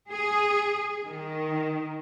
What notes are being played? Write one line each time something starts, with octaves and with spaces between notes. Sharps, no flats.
G#4
D#3